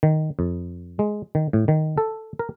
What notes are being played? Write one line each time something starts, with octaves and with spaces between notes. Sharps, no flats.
D#3
F2
G#3
D#3
A2
D#3
A4
A#4